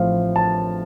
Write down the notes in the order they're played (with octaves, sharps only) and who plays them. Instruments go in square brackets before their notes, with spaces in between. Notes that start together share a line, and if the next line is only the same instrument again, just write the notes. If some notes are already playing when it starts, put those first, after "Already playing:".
Already playing: [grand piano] A1 A2 F3 C4 F5
A5